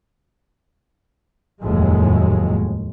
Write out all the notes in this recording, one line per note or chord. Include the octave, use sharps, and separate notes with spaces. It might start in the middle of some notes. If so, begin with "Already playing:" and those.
F1 D#2 A2 F#3 G#3